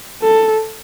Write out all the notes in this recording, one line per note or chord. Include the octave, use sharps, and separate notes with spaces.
A4